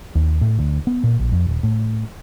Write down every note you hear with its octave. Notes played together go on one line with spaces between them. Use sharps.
D#2
A2
D2
B3
A#2
A#1
F2
D#1
A2